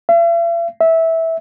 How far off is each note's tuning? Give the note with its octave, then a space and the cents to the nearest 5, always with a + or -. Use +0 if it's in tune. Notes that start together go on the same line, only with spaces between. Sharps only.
E5 +45
E5 -15